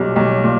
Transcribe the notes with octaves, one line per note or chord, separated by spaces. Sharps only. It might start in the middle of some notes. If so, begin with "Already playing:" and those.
Already playing: B1 A#2 G3
B1
A#2